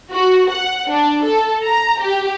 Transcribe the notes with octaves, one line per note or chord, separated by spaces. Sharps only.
F#4
F#5
D4
A4
A#5
G4